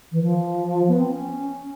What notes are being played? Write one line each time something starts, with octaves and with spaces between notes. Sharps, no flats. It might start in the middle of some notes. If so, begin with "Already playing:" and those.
E3
F3
B3
C4
C#4